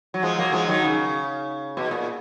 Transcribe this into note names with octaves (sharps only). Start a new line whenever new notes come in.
F#3
F3 G#3
F#3 A#3
F3 G#3
D#3 F#3
C#3
B2
A#2